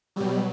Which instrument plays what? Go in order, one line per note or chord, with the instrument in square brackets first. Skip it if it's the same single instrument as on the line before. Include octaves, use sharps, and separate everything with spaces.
[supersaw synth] B2 F#3 G3